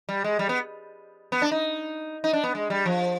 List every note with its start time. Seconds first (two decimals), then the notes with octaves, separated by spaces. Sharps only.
0.09 G3
0.24 G#3
0.39 G3
0.49 B3
1.32 B3
1.42 D4
1.51 D#4
2.24 D#4
2.33 D4
2.44 B3
2.55 G#3
2.70 G3
2.85 F3